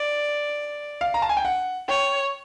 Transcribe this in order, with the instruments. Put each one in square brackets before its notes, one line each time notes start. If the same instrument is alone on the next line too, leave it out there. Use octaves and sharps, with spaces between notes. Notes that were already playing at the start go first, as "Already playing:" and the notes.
Already playing: [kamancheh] D5
[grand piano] F5
A#5
A5
G#5
G5
F#5
[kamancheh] C#5 [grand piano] G5